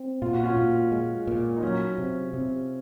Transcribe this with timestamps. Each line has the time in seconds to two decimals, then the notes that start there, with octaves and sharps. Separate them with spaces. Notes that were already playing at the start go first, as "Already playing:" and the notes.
Already playing: C4
0.22 A#2 F4
0.33 F#4
0.44 C#4 F4
0.57 A#2
0.92 G#3
1.27 A#2
1.57 D#4
1.63 F#3 C#4
1.98 C3
2.33 C3